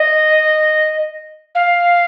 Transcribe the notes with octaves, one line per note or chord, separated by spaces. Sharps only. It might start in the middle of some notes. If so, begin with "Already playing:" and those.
Already playing: D#5
F5